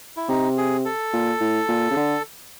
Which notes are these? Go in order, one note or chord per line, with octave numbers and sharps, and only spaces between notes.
E4
C3 D#4
G#4
A4
A#2
A2
A#2
C#3
D3